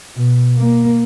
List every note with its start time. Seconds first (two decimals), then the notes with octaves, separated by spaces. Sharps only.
0.15 B2
0.57 A#3